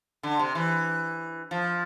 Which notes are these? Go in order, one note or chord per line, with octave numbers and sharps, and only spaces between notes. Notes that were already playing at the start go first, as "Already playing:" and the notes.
D3
C3
E3
F3